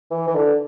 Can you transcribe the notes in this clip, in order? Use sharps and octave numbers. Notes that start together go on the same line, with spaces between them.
E3
E3
D3